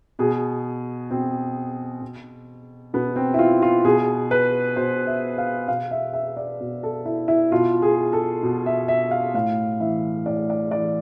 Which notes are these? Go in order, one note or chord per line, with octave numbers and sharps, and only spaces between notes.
B2 G#4
B2 C4
B2
B2 B3
C4
E4
F4
F4
B2 G#4
B4
B2 C5
E5
F5
B2 F5
E5
E5
D5
B2
A4
E4
E4
B2 F4
G#4
A4
B2
E5
E5
F5
A2 F5
E3 E5
A2 D5
D5
E3 D5